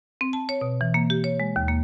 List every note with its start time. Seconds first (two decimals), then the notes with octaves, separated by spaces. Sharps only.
0.21 C4
0.33 A5
0.49 C#5
0.61 B2
0.81 E3
0.94 A#3
1.10 G4
1.24 C#5
1.40 G#3
1.56 D#2
1.68 A#3